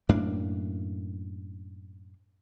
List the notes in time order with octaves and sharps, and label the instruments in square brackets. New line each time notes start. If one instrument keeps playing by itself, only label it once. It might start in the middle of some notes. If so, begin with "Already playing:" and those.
[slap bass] F#2 A2 A#3 D4